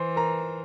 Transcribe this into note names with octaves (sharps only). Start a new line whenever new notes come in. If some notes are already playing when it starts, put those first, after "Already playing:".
Already playing: E3 C5 C6
A#4 A#5